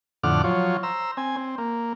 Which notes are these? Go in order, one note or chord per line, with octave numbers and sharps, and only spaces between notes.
F2 A2 D3 F#5 D6 F6
F3 F#3 F4 C#5
C5 A#5 E6
C4 G#5
C4
A#3